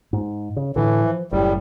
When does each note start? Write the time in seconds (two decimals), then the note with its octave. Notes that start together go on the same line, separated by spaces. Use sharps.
0.13 G#2
0.56 C#3
0.76 A2 D3 E3
1.05 F3
1.32 F#1 A2 G3